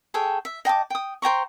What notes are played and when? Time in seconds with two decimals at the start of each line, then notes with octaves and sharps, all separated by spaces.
0.14 G#4 A4 C#5 G5
0.45 E5
0.65 D#5 G5 A5 D6
0.90 G5 D#6
1.22 C5 G5 A#5 C#6